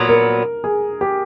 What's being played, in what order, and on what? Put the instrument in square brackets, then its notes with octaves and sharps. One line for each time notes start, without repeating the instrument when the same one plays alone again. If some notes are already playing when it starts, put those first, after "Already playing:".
Already playing: [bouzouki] A#2 F#3 B3
[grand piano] A#4
G#4
G4